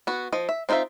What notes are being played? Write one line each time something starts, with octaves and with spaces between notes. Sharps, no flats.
B3 F#4
F3 D#5
E5
C4 D#4 F4 B4 E5